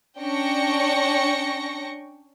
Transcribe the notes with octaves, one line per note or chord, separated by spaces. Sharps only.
C#4 D4 G5 C#6 A#6 C#7